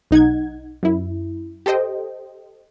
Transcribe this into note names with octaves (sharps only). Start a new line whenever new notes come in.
B1 D#4 F#5 G#6
F#2 E4
G4 A4 C5 D#5 G5